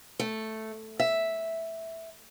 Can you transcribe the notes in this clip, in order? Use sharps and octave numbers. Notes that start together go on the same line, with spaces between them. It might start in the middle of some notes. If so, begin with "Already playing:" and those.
A3
E5